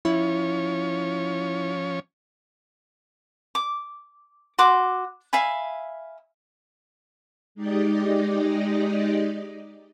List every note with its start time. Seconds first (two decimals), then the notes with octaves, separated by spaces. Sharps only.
0.05 F3 C#4 E4 C#5
3.55 D6
4.58 F#4 C6 D6
5.33 E5 F5 G#5 B5
7.55 G#3 D#4 G4 D5 D#5